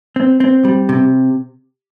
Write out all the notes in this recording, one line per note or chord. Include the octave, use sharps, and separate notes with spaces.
C4
C4
G3
C3